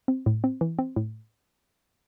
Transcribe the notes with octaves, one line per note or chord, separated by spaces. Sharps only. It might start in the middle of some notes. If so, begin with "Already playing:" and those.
C4
A2
C4
E3
C4
A2